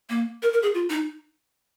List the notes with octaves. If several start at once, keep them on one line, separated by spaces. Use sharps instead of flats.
A#3
A#4
A#4
G#4
F4
D#4